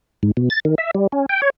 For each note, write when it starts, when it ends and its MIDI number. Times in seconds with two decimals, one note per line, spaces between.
0.23 0.31 44
0.37 0.49 47
0.50 0.60 93
0.65 0.75 51
0.78 0.91 76
0.94 1.07 55
1.12 1.26 61
1.29 1.41 79
1.42 1.50 73